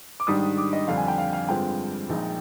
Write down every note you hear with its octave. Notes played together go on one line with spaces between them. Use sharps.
D6
G#2 D#3 G3 D4 D#6
D6
D#5
F2 D3 G3 D4 F5
G#5
G5
F5
F5
G2 D3 G#3 C4 F4 G5
A#1 A#2 G#3 D#4